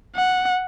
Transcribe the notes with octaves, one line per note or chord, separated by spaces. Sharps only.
F#5